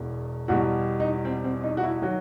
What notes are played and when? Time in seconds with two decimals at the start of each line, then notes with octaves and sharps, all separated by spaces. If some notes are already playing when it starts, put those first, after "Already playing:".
Already playing: E1 E2 B2
0.48 E2 B2 G3 F#4
1.00 D#4
1.25 C4
1.44 C4
1.63 D#4
1.77 F#4
1.83 E4
2.02 D#3 F#3 F#4